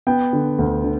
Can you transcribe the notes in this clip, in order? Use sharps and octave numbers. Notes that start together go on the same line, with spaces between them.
B3 G5
D3
D2
D3